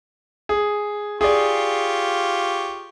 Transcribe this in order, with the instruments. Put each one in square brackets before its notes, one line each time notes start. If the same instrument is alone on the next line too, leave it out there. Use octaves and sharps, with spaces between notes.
[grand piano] G#4
[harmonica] F4 G4 C#6 [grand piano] G#4 D5